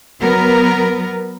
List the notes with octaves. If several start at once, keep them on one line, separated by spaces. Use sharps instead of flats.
F#3 B3 A#4